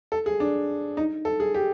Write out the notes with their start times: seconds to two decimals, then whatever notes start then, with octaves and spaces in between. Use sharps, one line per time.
0.12 A4
0.26 G#4
0.40 D4
0.97 D#4
1.25 A4
1.40 G#4
1.54 G4